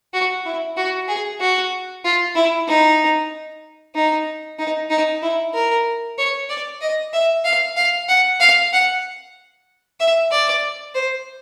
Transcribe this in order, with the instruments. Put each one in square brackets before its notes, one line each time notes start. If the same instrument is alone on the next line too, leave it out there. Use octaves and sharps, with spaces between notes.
[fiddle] F#4
E4
F#4
G#4
F#4
F4
E4
D#4
D#4
D#4
D#4
E4
A#4
C#5
D5
D#5
E5
F5
F5
F#5
F5
F#5
E5
D5
C5